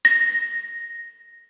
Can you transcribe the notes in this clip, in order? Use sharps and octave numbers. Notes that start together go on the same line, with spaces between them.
A#6